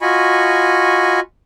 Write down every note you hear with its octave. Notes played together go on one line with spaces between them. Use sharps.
F4 F#4 D#5 G#5 B5 C#6